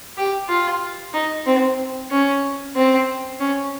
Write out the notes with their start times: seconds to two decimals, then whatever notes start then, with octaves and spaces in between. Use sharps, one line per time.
0.17 G4
0.48 F4
1.14 D#4
1.46 C4
2.11 C#4
2.75 C4
3.40 C#4